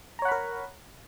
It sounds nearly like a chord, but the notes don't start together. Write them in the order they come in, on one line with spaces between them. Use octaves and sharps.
A#5 C#5 F#5 B5 A#4